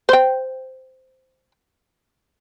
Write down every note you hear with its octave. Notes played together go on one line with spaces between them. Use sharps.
C5 G5